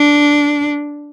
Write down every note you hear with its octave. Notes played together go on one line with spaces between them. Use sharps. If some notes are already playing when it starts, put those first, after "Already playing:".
Already playing: D4